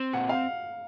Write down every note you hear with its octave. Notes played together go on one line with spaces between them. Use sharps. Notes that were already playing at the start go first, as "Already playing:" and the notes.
Already playing: C4
A#2 F#5
F5